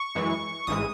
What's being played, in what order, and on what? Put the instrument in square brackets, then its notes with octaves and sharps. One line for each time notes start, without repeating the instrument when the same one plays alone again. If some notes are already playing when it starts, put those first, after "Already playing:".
Already playing: [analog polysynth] C#6
F#2 E3 G#3
A1 G#2 E3 G#3 D#6